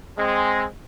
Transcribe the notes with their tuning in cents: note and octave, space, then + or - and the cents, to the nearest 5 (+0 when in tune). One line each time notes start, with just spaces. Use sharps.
G#3 -5 C4 +0